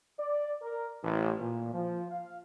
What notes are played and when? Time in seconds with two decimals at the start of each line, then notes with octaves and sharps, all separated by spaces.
0.18 D5
0.62 A#4
1.02 A1
1.40 A#2
1.73 F3
2.10 F5